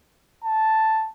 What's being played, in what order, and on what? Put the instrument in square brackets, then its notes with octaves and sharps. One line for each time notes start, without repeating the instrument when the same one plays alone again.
[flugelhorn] A5